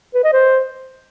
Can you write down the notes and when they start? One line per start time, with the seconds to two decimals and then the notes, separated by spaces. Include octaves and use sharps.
0.14 B4
0.24 D#5
0.33 C5